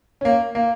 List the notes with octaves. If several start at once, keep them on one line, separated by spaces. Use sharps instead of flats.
A#3 C#4
A#3